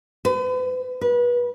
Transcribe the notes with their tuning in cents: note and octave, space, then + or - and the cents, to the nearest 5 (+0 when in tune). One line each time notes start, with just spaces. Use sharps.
B4 +40
B4 -30